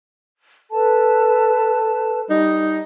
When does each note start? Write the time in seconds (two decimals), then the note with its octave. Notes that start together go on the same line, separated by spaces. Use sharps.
0.71 A4 B4 A5
2.30 G3 D#4